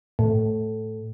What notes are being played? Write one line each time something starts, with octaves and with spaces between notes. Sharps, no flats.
A2